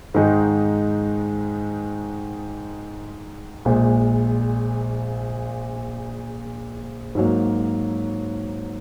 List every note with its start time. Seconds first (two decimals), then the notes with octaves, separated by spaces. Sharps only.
0.14 G#2 D#3 G#3 D#4
3.65 A#1 A#2 G#3
7.15 G#2 F#3 A#3